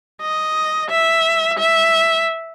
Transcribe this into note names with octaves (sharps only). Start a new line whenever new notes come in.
D#5
E5
E5